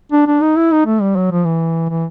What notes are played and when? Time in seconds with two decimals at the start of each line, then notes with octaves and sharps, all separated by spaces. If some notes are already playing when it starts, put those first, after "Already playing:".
0.12 D4
0.27 D4
0.42 D#4
0.56 E4
0.72 D#4
0.86 A3
1.01 G3
1.16 F#3
1.31 F3
1.45 E3
1.89 E3